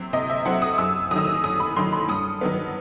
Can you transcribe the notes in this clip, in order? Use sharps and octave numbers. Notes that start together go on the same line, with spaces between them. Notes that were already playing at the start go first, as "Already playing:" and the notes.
Already playing: C3 F#3 C4
C3 D#5
E5
F#3 C4 F#5
D#6
F#2 E6
D#3 F#3 D#6 E6
D#6
F#2 D#6
B5
D#3 F#3 C6
B5
G2 D#6
D#3 F#3 B3